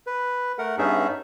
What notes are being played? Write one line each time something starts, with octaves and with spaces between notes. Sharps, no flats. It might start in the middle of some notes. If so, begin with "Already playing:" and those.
B4
A3 A#4 F#5
G2 B3 C#4 D#4 G#4 E5